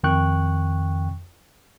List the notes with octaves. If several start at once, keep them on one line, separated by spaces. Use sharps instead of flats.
F2 D#3 G5 C#6 F#6